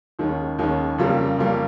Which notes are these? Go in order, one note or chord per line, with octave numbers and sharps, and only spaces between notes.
D#2 D#3 G#3 C#4
D#2 D#3 G#3 C#4
F2 C#3 G3 A#3
F2 C#3 G3 A#3